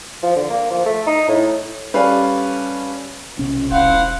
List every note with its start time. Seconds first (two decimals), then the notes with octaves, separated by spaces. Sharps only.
0.23 F3
0.36 D3
0.50 A#3
0.70 F3
0.86 A3
1.06 D#4
1.28 A2
1.94 G3 C#4 A4 B4 D5 F5
3.39 B1 C3 C#4
3.71 E1 E4 C5 F5 F#5